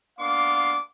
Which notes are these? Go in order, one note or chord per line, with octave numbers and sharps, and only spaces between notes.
A#3 B3 D4 F5 C6 D6